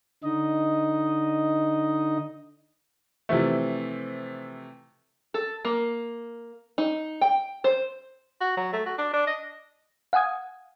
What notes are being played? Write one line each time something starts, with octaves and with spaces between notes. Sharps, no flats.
D3 D#4 D#5
C3 E3 F3 A3
A4
A#3
D#4
G5
C5
F#4
F#3
A3
F#4
D4
D4
D#5
F5 F#5 G#5 D#6 G#6